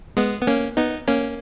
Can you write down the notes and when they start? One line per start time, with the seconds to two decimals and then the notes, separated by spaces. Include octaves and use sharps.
0.17 G#3 B3
0.41 B3
0.47 A#3 C#4
0.77 B3 D#4
1.08 A#3 C#4